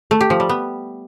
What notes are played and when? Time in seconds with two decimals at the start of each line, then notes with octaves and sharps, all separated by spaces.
0.11 A3
0.21 G4
0.30 F3
0.40 G3
0.49 B3